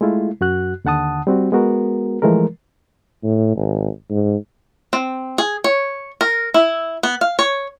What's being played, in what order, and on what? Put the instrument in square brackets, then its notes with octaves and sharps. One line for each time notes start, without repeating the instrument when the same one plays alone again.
[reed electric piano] G#3 A3 E4 F4
F#2 F#4 F#6
D#2 D3 F#5 A5 D#6
G3 C4 F#4
G#3 B3 F#4 A#4
E3 F3 G#3 A3 A#4
[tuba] A2
G#1
G#2
[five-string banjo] C4
G#4
C#5
A#4
E4
B3
F5
C#5